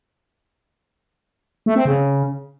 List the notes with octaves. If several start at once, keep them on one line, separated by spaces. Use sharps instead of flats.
A3
C4
C#3